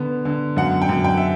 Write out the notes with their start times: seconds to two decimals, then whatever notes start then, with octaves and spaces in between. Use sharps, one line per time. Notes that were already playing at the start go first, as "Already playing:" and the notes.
Already playing: D3 B3
0.25 D3
0.57 F#2 F#5
0.82 G5
0.89 F#2
1.04 G5
1.17 E5